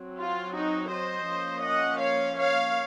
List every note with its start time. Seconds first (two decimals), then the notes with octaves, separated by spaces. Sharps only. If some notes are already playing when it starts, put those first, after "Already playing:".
Already playing: F#3 C4
0.18 F4
0.54 D#4 F#4
0.91 C5 D#5
1.27 F3 A#3 C#4
1.63 D#5 F#5
2.00 C#5 F5
2.37 C#5 F5